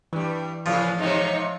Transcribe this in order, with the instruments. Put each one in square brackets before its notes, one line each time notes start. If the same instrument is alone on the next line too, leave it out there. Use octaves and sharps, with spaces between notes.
[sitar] G2 G3 [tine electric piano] E3
[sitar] A2 C#3 F4 [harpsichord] F3
[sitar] G#2 C3 [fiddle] D#4 C#5